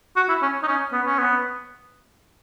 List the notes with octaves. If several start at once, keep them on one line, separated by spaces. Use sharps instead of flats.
F#4
E4
C#4
D#4
C#4
B3
C#4
B3